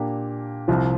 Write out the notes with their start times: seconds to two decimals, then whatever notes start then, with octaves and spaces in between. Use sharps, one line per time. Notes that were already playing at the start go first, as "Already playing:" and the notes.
Already playing: A#2 A#3 D4 G4
0.68 C2 C3 F3